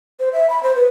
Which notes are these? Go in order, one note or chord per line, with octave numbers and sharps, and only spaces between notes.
C5
E5
B5
C5
B4